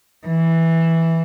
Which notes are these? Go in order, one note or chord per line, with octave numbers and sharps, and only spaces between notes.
E3